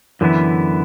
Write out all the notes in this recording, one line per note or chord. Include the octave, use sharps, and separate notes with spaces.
F#2 D3 E3 B3 E4